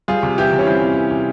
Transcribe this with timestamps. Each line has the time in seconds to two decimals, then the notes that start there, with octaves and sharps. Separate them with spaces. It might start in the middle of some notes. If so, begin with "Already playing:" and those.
0.08 G3 F4 G#4
0.23 C3
0.38 E3 E4 G4
0.52 C3
0.59 C#4
0.67 G3 C4 E4
0.81 C3
0.97 E3
1.11 C3